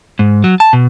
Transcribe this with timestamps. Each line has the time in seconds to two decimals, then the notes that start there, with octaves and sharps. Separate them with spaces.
0.19 G#2
0.44 F#3
0.60 A5
0.73 B2